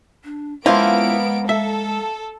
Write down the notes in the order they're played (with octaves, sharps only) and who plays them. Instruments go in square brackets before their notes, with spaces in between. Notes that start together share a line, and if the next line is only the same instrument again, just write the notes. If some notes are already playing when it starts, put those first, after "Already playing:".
[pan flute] D4
[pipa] F3 A#3 [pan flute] G#3 [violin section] B3 D7 [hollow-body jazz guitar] C#4 E4 F4
[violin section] A4 [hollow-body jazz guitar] E5